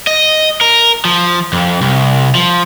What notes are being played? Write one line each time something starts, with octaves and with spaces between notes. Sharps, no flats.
D#5
A#4
F3
F2
C2
F3